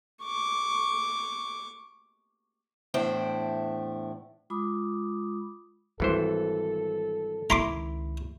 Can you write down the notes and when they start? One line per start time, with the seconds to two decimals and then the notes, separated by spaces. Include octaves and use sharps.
0.23 C#6 D6
2.94 E2 A2 D4 E4 C5 G5
4.50 G#3 F4 B5 D6 D#6
6.00 G#1 E3 G3 A4 C5
7.50 C#2 D#3 E4 A#5 C6 D6